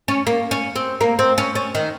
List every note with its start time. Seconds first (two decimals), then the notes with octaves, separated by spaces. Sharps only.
0.08 C#4
0.27 A#3
0.51 C#4
0.76 C4
1.01 A#3
1.19 C4
1.38 C#4
1.55 C#4
1.75 D#3